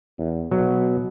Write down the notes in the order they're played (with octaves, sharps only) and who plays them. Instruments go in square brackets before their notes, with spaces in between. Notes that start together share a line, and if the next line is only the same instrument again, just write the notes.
[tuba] E2
[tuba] B2 [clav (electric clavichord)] F#3